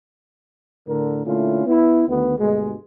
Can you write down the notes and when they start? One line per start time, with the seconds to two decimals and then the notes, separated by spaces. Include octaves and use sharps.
0.88 A2 D3 A#4
1.25 A#2 D3 A3 C#4 E4 F4
1.66 B3 E4
2.08 D2 D#3 B3
2.38 D2 G2 B2 G#3